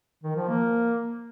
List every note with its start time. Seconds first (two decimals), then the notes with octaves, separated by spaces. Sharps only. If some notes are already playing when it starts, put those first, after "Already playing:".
0.23 D#3
0.36 F3
0.49 A#3